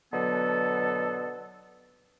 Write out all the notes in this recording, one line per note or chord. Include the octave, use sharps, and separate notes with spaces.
B2 D3 F#3 B3 A4